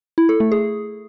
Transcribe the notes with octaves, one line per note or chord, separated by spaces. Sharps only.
E4
A4
A3
G#4